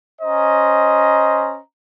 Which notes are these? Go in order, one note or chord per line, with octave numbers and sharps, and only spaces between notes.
C#4 C5 D#5 A#5